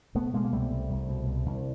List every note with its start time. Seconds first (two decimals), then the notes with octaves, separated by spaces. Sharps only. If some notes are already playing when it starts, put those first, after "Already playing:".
0.15 B2 A3 B3
0.33 B2 G#3 A#3
0.45 A#3
0.52 C2 G3 A3
0.71 C2
0.90 C2
1.09 B2
1.26 C2
1.46 C2